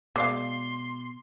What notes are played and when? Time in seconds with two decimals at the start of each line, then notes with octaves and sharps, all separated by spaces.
0.16 B2 G#3 D5 F5 C6 D6 C7